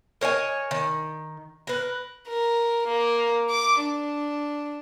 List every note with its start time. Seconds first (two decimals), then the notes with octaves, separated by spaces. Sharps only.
0.21 A#4 C#5 D#5 G#5
0.71 D#3
1.67 A#4 B4
2.28 A#4
2.88 A#3
3.50 D6
3.81 D4